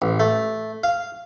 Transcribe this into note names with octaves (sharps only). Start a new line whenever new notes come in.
A1
A3
F5